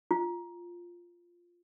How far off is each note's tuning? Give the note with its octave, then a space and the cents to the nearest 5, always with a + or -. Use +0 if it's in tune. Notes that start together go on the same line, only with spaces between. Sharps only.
F4 -5